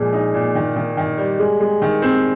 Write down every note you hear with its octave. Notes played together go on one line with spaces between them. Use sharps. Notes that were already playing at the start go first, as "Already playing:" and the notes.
Already playing: A#2 F3 G#3
D#4
A#2
D#3
D#3
D#3
G3
G#3
G#3
D#3
C4